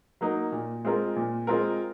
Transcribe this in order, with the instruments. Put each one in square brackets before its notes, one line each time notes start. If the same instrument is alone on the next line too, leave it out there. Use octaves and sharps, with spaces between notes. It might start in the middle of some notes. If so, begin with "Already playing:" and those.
[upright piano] F#3 A#3 D#4
A#2
G#3 C4 F4 A#4
A#2
G#3 C4 F4 A#4